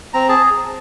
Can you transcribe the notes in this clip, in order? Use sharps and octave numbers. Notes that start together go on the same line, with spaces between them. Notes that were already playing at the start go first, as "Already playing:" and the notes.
C4 A#5
G#4 A5